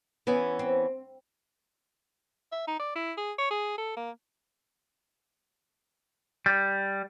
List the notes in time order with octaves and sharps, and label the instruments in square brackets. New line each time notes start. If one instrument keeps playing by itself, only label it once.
[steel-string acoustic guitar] E3 B3 C#4 [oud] E4
[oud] C4
[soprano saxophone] E5
D#4
D5
E4
G#4
C#5
G#4
A4
A#3
[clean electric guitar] G3